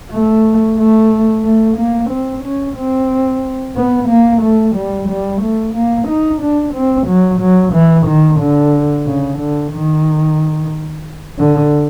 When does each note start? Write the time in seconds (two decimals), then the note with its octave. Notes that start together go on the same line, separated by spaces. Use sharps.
0.11 A3
0.78 A3
1.44 A3
1.78 A#3
2.10 C4
2.44 C#4
2.77 C4
3.76 B3
4.09 A#3
4.42 A3
4.76 G3
5.09 G3
5.42 A3
5.75 A#3
6.08 D#4
6.42 D4
6.74 C4
7.08 F#3
7.40 F#3
7.74 E3
8.07 D#3
8.40 D3
9.06 C#3
9.39 D3
9.72 D#3
11.38 D3